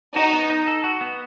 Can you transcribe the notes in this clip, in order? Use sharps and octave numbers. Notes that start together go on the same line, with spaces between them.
D#4 F#4
B3
D#4
A4
F#4
B3